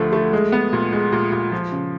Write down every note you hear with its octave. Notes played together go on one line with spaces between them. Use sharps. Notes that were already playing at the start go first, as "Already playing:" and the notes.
Already playing: D2 D3 F3 A3
A3
G#3
B3
A#2
G#3
A#2
A#2
F3
C#3